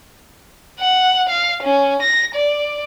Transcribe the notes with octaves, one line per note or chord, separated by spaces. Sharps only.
F#5
F5
C#4
A#6
D5